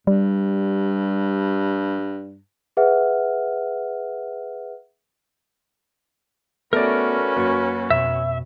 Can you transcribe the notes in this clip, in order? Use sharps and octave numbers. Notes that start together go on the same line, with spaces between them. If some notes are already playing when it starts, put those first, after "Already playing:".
G2 G3
G#4 B4 E5 F#5 F6
A3 B3 C#4 F#4 A#4 B4 D5
F#2 A#3 C#6
F2 B2 E5